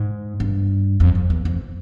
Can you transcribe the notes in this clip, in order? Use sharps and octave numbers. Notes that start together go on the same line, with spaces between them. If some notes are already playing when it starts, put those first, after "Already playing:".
Already playing: G#2
G2
F2
F2
E2
F2